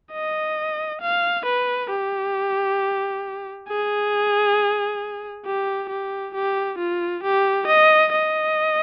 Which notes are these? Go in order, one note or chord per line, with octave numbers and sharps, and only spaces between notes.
D#5
F5
B4
G4
G#4
G4
G4
G4
F4
G4
D#5
D#5